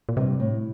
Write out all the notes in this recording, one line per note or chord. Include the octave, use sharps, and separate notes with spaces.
A#2
G2 C3
A2